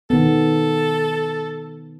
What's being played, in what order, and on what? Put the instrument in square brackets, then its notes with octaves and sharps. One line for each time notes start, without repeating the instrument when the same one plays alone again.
[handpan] D#3 B3 [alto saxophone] A4